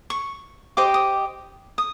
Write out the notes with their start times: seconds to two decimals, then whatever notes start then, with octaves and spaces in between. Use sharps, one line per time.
0.10 C#6
0.77 G4 C5 D#5 D6
0.94 D#6
1.78 D#6